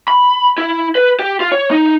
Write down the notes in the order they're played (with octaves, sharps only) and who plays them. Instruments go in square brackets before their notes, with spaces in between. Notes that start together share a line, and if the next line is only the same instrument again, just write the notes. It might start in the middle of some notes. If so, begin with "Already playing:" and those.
[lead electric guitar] B5
E4
B4
G4
F4
C#5
D#4